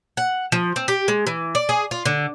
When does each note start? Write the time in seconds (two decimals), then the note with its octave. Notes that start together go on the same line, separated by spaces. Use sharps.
0.17 F#5
0.52 F3
0.76 C4
0.88 G4
1.08 G#3
1.27 E3
1.55 D5
1.69 G#4
1.91 F4
2.06 D3